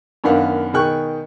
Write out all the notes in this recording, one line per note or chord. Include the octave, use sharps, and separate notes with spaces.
F#2 D#3 B3 D4 F5 F#5
B2 D#3 G#4 G5 C#6 F#6